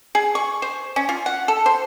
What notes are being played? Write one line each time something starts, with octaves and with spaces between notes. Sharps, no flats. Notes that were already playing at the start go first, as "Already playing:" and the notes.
G#4
C#6
C5
C#4
F4
F#5
A4
C5